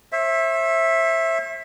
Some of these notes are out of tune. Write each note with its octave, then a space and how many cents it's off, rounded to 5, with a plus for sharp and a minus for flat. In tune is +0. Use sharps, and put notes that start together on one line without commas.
C5 +45 E5 +0